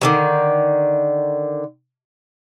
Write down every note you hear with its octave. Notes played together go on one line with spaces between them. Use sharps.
D3 D#3 F#3